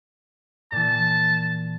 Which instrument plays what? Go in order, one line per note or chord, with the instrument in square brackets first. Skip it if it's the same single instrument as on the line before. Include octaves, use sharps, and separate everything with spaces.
[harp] A#2 E3 [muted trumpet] A5